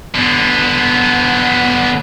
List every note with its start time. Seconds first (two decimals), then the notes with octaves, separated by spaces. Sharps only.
0.15 D3 B3